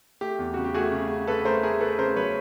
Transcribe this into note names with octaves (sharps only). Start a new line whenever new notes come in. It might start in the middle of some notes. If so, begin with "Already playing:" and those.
A3 G4
E2
C#3 F#4
G4
A3 F#4 G#4
C#3
C#3
C#3 A4 B4
A3 A#4 C5
A3 G#4 A#4
A3 A4 B4
C#3 A#4 C5
F#3 B4 C#5